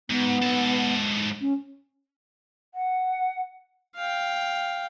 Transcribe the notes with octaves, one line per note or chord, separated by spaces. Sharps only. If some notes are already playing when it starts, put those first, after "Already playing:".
G#2 B3
G#2 A4
C#4
F#5
F5 G5